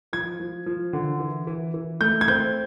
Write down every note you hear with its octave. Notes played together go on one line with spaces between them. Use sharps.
F3 G#6
F3
F3
D3
E3
E3
E3
A3 G6
G#6
C4 G6